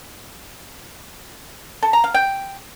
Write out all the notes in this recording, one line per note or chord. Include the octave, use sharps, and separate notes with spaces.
A4
A#5
F5
G5